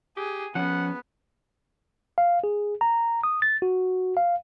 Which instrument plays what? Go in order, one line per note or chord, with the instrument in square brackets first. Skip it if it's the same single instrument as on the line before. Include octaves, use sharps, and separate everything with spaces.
[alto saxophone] G4 [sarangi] G#4
[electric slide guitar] F3 C#4 [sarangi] B3 [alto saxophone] F#5
[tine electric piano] F5
G#4
A#5
D#6
A6
F#4
F5